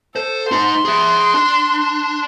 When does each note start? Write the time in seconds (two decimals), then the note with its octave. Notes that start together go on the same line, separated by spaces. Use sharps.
0.16 A4 C5
0.51 D#4 C5 C6
0.85 G#4 E5
1.34 D4